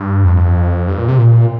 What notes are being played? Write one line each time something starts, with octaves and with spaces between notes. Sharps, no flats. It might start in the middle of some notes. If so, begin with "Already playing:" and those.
Already playing: G2
F2
G2
A#2
C3
A#2